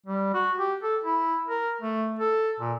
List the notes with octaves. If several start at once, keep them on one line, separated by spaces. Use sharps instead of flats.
G3
F#4
G4
A4
E4
A#4
A3
A4
A#2